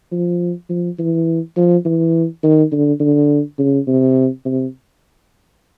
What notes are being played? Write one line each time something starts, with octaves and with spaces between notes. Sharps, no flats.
F3
F3
E3
F3
E3
D#3
D3
D3
C#3
C3
C3